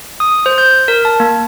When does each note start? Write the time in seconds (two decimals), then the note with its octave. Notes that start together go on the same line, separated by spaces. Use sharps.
0.20 D#6
0.46 C5
0.58 G6
0.88 A#4
1.05 A5
1.20 A#3